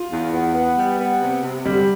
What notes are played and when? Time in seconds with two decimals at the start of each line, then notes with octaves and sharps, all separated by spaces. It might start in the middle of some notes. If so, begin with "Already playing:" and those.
Already playing: F4
0.11 E2
0.33 B3
0.55 B3
0.77 G3
0.99 B3
1.21 C3
1.43 C3
1.65 D3 G3